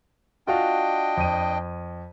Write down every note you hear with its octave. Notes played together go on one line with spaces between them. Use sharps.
D4 F4 F#4 D#5 F5 G5
F2 D#7